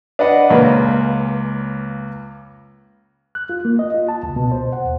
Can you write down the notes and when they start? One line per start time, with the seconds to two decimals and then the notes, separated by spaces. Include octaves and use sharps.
0.19 D4 B4 D#5 F#5
0.50 C#2 A#3 C#4 B4
3.35 F#6
3.49 F4
3.65 A#3
3.79 D#5
3.95 F4
4.08 A5
4.23 C#2
4.36 B2
4.52 C5
4.73 F#5
4.85 D#2